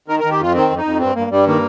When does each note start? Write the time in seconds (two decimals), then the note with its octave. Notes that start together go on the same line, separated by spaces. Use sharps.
0.08 D#3 A#4
0.20 D#3 A#4
0.31 G4
0.39 F2 F4
0.54 D#3 C4
0.69 F2
0.77 D#4
0.84 F2
1.00 G2 C4
1.15 G2 A#3
1.31 G2 G3
1.47 D#3 A#3